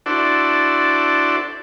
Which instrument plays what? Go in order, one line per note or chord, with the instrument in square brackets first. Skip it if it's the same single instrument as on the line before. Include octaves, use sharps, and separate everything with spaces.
[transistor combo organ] D4 E4 F#4 A4 C5 D5